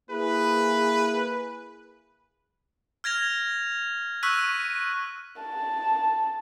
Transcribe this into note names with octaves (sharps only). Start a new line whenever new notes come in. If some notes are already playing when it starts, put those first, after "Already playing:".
A#3 E4 G#4 B4
F6 G#6 A#6 F7
C#6 E6 F#6 B6 D#7
A5